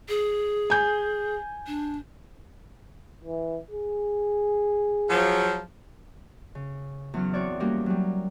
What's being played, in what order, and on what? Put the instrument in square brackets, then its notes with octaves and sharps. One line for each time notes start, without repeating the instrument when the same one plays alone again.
[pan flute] G#4
[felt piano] G#5 G6
[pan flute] D4
[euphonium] E3
G#4
[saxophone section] F3 F#3
[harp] C#3
E2 F#3 C#4 F6
C4 F#4 C#5 D5
G3 A#3 C#4 F#4 G4 A#4
F#3 G3